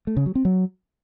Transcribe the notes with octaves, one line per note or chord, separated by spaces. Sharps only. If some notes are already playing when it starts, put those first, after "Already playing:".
A3
C#3
F#3
C4
F#3